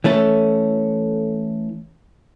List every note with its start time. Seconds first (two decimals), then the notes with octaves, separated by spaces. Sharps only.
0.04 E3 A3 C#4 A4